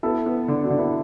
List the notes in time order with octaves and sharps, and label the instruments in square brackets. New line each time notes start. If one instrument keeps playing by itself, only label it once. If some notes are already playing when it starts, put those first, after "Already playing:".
[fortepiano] B3 [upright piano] E4 A4
[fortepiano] B3
D3
[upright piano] D4 F#4
[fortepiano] D3
[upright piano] B3 E4